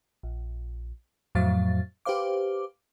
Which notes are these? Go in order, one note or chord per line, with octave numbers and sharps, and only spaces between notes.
A#1
F2 A2 F#3 F5 A6
G4 B4 C5 F5 D6